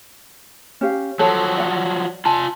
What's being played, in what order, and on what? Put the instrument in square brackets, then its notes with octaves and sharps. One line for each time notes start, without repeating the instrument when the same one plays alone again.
[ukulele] C#4 G4 F5
[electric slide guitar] F3 F#3 [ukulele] A4 [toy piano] C#5
[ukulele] D5 F#5
[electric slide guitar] F4 G#5 [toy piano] A5